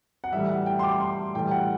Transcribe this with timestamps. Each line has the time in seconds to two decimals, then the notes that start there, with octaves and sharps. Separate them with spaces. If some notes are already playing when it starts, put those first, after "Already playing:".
0.24 F#5
0.32 A2 E3 G3 E5
0.49 F#5
0.66 G5
0.79 C6
0.83 D6
1.00 C6
1.35 A2 E3 G3 G5
1.51 F#5